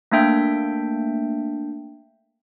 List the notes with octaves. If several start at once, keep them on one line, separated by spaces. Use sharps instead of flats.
A3 A#3 D4 E5 G5 G6